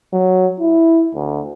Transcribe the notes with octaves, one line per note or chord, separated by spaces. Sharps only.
F#3
E4
D2